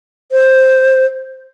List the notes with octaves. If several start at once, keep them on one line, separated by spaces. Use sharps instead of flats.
C5